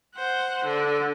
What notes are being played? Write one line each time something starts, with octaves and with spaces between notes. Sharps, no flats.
C5 F#5
D3 D4